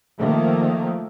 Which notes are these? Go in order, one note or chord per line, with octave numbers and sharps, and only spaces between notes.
D#3 F3 A3 A#3